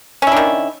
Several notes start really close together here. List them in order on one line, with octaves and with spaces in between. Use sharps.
C#4 E4 D4 D#3